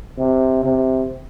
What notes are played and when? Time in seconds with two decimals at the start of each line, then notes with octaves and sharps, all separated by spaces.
0.18 C3
0.64 C3